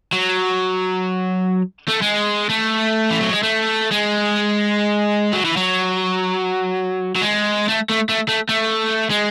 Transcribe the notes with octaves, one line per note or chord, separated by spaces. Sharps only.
F#3
A3
G#3
A3
E3
F#3
G#3
A3
G#3
F#3
E3
F#3
F#3
G#3
A3
A3
A3
A3
A3
G#3